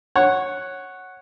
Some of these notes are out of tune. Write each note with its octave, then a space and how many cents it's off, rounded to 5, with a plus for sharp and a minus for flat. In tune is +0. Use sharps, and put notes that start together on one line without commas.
C#5 -10 F#5 +0